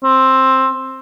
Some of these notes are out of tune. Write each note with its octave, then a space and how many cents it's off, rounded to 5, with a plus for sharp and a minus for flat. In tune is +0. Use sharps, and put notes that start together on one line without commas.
C4 +10